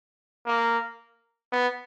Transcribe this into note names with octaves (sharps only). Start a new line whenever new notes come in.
A#3
B3